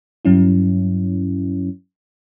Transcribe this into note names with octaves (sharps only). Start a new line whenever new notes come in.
G2 F#3 C#4 E4